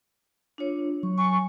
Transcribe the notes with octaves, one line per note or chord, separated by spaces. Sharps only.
D4 F4 C#5
F#3 C#6
G#5 C#6